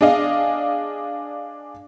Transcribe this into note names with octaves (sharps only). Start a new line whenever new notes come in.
D4 G#4 D#5 F5